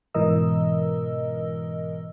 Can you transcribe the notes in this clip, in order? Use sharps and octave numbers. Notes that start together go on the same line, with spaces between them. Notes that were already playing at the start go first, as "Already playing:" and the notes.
G#2 B2 E3 A#4 D#5 E6